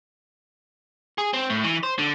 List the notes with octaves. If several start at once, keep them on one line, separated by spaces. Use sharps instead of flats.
G#4
C4
A2
E3
C5
D3